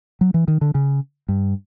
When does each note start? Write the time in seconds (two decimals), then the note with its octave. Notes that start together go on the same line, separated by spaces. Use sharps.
0.21 F#3
0.34 E3
0.48 D#3
0.61 D3
0.75 C#3
1.28 G2